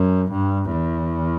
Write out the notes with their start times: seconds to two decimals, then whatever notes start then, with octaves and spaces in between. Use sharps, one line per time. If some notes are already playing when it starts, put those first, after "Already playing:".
Already playing: F#2
0.32 G2
0.72 E2